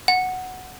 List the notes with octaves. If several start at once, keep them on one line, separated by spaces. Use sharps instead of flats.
F#5